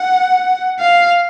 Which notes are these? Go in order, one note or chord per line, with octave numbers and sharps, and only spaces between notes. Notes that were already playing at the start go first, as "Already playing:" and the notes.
Already playing: F#5
F5